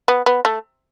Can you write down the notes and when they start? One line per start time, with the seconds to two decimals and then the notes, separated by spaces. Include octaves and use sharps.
0.08 B3
0.26 B3
0.45 A3